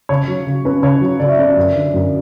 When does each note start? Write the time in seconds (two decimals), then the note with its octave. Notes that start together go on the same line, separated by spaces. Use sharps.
0.09 C#3 C#5
0.28 F#3
0.47 C#3
0.65 C#4 B4
0.83 C#3 C#5
1.01 F#3
1.20 C#3 D5
1.29 E5
1.39 C#4 D5
1.57 F#2
1.75 D3
1.94 F#2